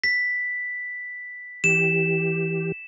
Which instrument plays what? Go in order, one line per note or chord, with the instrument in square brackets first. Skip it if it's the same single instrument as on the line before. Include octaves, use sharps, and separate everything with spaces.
[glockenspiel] B6
[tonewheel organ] E3 G4 [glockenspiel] E7